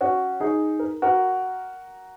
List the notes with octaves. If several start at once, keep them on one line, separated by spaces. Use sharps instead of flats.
C#4 F#4
D#4 G#4
A#4
F#4 A#4